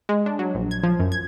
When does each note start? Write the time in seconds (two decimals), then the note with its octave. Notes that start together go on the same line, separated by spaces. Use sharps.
0.09 G#3
0.26 D4
0.39 F#3
0.55 A#1
0.71 G#6
0.84 F3
1.00 F#2
1.12 G#6